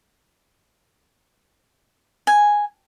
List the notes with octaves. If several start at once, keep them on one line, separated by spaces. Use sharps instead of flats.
G#5